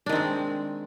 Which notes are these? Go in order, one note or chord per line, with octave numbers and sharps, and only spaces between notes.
D#3 G#3 C4 D4